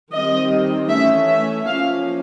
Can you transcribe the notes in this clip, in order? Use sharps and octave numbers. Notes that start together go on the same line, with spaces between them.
D#3 G3 C4 D#5
E3 A3 C#4 E5
E5
F3 A#3 C#4 F5